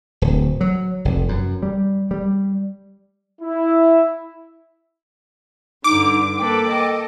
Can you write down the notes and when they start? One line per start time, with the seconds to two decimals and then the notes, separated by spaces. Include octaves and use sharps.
0.22 D1
0.61 F#3
1.05 F1
1.29 F#2
1.63 G3
2.11 G3
3.41 E4
5.84 G2 D3 D#4 D6
6.38 A#3 A4 B4 G5
6.70 A4 D#5